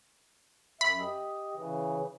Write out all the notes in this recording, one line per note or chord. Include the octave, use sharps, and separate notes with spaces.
F#2 E5 B5
G4 D#5
C#3 E3